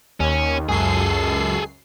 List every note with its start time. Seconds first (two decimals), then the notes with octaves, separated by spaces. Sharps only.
0.20 D#2 C#4
0.69 C#2 F#2 G#4 A4 C7